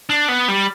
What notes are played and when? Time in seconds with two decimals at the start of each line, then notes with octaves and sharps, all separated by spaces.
0.10 D4
0.28 B3
0.48 G3